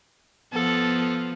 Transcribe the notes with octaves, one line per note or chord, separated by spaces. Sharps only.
F3 B3 A4